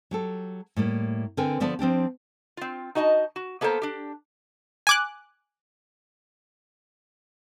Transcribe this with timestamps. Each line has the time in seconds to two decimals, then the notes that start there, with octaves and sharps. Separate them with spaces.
0.11 F#3 G4 A4
0.76 A2 G3 A#3
1.37 D3 C4 A#4 B4 G5 G#5
1.60 D3 F3 B3 D5 A5
1.79 F3 C4 D4 G4
2.57 C4 F4
2.95 D#4 F#4 D#5 G#5 A5
3.36 F#4
3.61 A#3 B3 A4 A#4 C5
3.82 D4 G4
4.87 G#5 D6 F#6